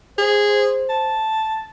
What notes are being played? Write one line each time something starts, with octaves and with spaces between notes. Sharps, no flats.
G#4 C5
A5